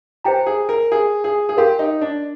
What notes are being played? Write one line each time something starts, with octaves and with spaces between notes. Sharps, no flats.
G4 C5 G5 A#5
G#4
A#4
G#4
G#4
G#4
G4 A#4 F5 C6
D#4
D4